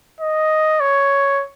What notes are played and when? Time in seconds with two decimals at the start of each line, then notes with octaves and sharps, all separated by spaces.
0.21 D#5
0.81 C#5